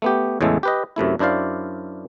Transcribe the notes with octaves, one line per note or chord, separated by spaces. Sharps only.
A3 B3 G4
E2 A2 C#3 G#3 A3 A4
G4 B4 D#5
F#2 C3 A3 E4
F#2 D4 E4 C5 D5 F5